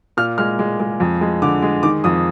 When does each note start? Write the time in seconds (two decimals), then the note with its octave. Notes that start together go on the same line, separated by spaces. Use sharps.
0.17 A#2 F6
0.38 G#3 F6
0.59 G#3
0.80 G#3
1.00 F2
1.21 G#3
1.42 D3 D6
1.62 G#3
1.83 D#3 D6
2.04 F2 D#6